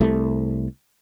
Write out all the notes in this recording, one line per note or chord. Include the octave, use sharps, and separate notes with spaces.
C2 A3